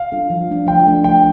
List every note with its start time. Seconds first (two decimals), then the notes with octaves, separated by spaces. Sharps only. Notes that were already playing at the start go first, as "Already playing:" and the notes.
Already playing: F5
0.12 G3 D4 F4 A4
0.30 F3
0.49 A3 D4
0.67 F3 G5
0.86 A3 D4
1.04 F3 G5